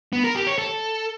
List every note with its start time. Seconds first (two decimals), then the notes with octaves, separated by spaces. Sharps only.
0.13 B3
0.24 A#4
0.35 G4
0.47 C#5
0.58 A4